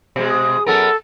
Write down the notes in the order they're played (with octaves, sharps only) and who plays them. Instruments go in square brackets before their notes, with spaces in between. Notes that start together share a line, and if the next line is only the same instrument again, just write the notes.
[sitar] B2 G#3
[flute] D#6
[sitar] F#2 B3 A#4 [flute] A4